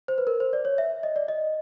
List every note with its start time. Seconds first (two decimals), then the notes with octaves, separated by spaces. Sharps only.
0.08 C5
0.18 B4
0.27 A#4
0.40 C5
0.53 D5
0.65 C#5
0.78 E5
1.03 D#5
1.16 D5
1.28 D#5